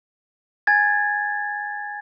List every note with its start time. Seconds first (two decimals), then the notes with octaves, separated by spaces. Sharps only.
0.67 G#5 G#6 A6